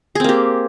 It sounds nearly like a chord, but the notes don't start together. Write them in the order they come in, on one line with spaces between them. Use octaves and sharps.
G#4 C4 A#3 G4